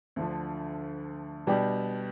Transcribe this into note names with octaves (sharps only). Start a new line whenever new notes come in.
D2 D3 F3
B2 G3 D4 G4